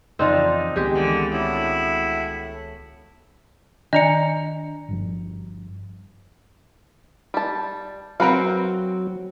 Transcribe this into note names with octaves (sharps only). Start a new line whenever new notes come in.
F2 C#3 E3 C4 D4 D#4 F4
C#2 D#3 G#3 B3 G4
D3 E3
A2 E4 F#4
D#3 D4 D5 D#5 G#5 A#5 C#7
G1 G2 F3
G3 A5
F#3 C4 F#4 A#4 B4 F5